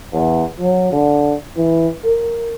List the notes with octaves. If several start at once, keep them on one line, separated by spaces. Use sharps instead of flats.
E2
F#3
D3
E3
A#4